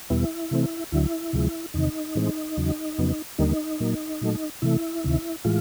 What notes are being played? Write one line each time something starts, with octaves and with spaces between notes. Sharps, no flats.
E2 B2 G3 B3 E4
C3 E3 A3 C4
D2 D3 F#3 E4
D2 C3 F3 G#3
E2 C3 D#3 D#4
A2 E3 G#3 C4
E2 C#3 F#3
F2 C#3 F#3 B3
D#2 D3 G3 A#3 D#4
A#2 F#3 A#3
A#2 F#3 A3
C3 E3 A3 E4
D2 C3 D#3
A2 E3 G#3 F4